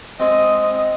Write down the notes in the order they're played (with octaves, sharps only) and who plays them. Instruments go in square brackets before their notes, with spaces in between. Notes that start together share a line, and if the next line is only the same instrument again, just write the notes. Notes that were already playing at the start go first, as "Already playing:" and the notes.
[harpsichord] G#3 C4 [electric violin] D#5